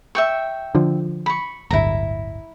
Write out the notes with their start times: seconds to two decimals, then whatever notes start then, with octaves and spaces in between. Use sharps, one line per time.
0.15 E5 G5 C#6
0.75 D3 F3
1.26 B5 C#6
1.71 D1 G1 E4 A#5